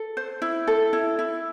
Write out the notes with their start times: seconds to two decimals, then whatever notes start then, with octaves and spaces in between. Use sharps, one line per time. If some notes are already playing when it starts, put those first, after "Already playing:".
Already playing: A4
0.17 C5
0.42 E4
0.67 A4
0.93 E4
1.19 E4